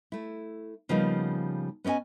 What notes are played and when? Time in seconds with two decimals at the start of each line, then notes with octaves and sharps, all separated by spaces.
0.12 A3 E4
0.89 C#3 F3 G3 A#3 B3 D#4
1.84 B3 C#4 D5 D#5 G#5